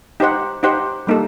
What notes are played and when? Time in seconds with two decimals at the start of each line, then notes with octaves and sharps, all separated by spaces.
0.20 D#4 G4 C5 F#5
0.63 D#4 G4 C5 F#5
1.07 G3 A#3 D#4 A4